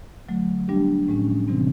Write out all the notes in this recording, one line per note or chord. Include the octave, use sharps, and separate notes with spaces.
D3 F#3 A3
G3 B3 D4 G4
A2 F3 G#3 C#4
C3 E3 G3 C4